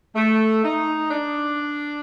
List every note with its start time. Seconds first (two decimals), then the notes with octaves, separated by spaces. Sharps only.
0.15 A3
0.63 D#4
1.10 D4